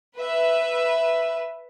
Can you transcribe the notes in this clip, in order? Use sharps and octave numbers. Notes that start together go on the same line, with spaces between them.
B4 E5